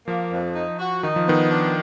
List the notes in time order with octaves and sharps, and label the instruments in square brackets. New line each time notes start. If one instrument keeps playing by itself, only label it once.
[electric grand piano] F3 [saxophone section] A#3
[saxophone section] F2
D#4
F#4
[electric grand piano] D#3 [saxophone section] D#4
[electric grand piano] F3
[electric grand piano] D#3 [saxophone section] B3
[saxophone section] D4